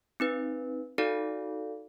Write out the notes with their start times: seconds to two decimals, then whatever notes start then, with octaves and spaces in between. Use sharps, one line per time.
0.20 C4 D#4 B4
0.98 D#4 F#4 A4 D5 F5